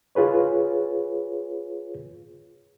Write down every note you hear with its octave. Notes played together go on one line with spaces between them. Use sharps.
F4 G#4 B4 C#5